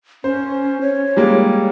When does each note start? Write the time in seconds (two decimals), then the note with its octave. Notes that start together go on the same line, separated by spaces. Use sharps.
0.24 C#4 C5
0.81 C#5
1.17 G3 G#3 A#3